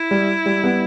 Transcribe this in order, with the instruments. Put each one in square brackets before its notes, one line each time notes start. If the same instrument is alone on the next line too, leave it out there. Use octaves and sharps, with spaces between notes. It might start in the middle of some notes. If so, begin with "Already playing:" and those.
Already playing: [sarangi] E4
[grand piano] G3
G3
G3 B3